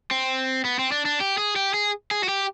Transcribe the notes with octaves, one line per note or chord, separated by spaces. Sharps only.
C4
B3
C4
D4
D4
G4
G#4
G4
G#4
G#4
F#4
G4